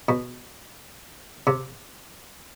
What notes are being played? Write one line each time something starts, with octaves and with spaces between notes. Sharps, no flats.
B2
C3